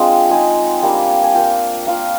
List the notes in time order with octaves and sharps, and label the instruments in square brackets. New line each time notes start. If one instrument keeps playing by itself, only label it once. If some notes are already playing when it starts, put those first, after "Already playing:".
Already playing: [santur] G#3 C4 D4 F4
G#3 D#4 G#5
G3 A#3 D4
G#5
A#3 D4 F4 G5
A#3 F4 F5